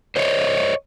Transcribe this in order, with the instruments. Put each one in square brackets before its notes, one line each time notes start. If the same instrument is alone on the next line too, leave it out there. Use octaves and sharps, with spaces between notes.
[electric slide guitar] C5 C#5 D#5